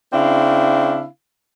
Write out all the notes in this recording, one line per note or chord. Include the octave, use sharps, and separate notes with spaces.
C#3 C4 D4 E4 F5